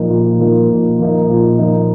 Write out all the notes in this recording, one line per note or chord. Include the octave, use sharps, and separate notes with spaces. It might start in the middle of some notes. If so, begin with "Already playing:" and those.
Already playing: A#2 F3 A#3 D#4
A#2
F3 A#3 D#4
A#2
F3 A#3 D#4
A#2
F3 A#3 D#4